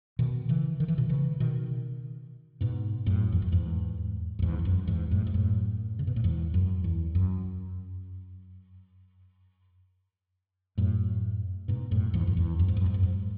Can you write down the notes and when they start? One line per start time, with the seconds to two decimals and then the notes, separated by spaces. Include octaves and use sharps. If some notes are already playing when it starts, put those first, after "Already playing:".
0.19 B2 D#3
0.49 C#3 E3
0.80 D#3
0.88 E3
0.98 B2 D#3
1.09 C#3 E3
1.40 B2 D#3
2.61 G#2 B2
3.06 F#2 A2
3.32 E2
3.42 F#2
3.52 E2 G#2
4.39 F#2
4.42 E2 G#2
4.59 E2
4.65 F#2
4.87 E2 G#2
5.11 F#2 A2
5.27 G#2
5.34 F#2 A2
5.99 C#3
6.07 B2
6.16 A2
6.24 E2 G#2
6.54 F#2
6.84 E2
7.15 F#2
10.78 F#2 A2
11.68 G#2 B2
11.91 F#2 A2
12.14 E2 G#2
12.27 F#2
12.37 E2
12.59 F#2
12.68 G#2
12.77 F#2
12.86 G#2
12.94 F#2
13.03 G#2